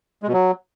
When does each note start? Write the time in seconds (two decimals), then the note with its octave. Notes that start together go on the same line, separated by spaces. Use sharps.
0.23 G#3
0.28 B2
0.33 F#3